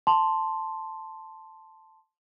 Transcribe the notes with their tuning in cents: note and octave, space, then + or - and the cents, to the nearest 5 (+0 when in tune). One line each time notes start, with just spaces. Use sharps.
A5 +0 C6 +0